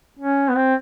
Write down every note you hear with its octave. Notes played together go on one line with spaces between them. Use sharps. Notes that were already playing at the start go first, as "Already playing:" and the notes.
C#4
B3
C4